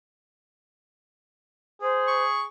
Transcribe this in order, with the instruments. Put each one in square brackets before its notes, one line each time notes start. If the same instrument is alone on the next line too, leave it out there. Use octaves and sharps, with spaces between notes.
[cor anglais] G#4 [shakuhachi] C5
[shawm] C#6